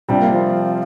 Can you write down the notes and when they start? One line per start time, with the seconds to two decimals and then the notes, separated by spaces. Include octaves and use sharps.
0.09 C3 G3 C4 D4 F4
0.20 A#3
0.32 F3